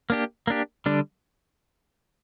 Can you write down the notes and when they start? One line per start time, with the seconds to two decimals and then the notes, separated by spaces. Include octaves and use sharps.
0.10 A#3 D4 G4
0.47 A#3 D4 G4
0.86 D3 G3 D4